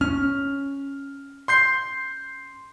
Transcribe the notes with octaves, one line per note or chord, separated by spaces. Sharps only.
C#4 F6
C6 G6 C7